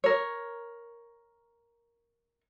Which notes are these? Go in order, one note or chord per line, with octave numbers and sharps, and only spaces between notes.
A#4 C#5